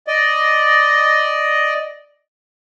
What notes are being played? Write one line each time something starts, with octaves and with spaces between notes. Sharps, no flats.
D5 D#5